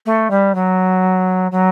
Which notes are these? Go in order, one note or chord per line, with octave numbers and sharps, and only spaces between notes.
A3
G3
F#3
F#3